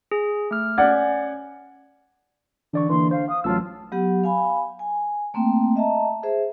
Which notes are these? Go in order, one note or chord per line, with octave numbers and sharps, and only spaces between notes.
G#4
A3 F6
C#4 D5 F#5 G#6
D3 E3 D5 C#6
D3 E3 A#3 C6
C5 F5
F5 D#6
A1 F#3 F4 A5 E6
F#3 B3 G4 F#5
F5 G#5 B5
G#5
A3 A#3 C4 G5
D#5 E5 A5 A#5
G#4 C5 E5